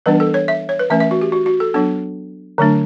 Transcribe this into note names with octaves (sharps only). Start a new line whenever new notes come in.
E3 G3 B3 D4 B4
A4
C#5
E5
C#5
B4
E3 A3 C#4 E5
E5
F#4
G4
F#4
F#4
A4
F#3 B3 D4 A4
D3 F#3 A3 D4